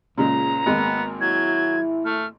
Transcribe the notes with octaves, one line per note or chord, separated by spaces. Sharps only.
C#2 A#2 C#3 G#3 A#5
G#1 G#3 A#3 B3
F#3 E4 G#6
A3 F6